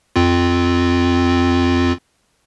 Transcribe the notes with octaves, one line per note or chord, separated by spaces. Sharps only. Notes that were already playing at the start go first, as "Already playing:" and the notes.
F2 C4 F4